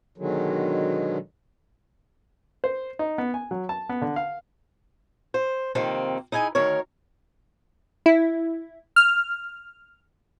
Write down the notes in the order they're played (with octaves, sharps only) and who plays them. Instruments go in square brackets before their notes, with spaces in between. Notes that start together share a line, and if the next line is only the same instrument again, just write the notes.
[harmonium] B2 D3 D#3 F#3 G#3
[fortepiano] C5
D#4
B3
G#5
F#3
A5
B3
D3
F5
[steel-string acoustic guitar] C5
F2 C3 D#3 A#3 C4
D#4 E4 G#4 G#5
D2 D#3 A#4 C#5
[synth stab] E4
F6